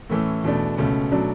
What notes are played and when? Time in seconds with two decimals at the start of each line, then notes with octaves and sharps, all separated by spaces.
0.10 A2 E3 A3 C#4
0.44 E2 B2 A3 D4
0.77 C#2 B2 A3 C#4
1.12 B2 F#3 A3 D4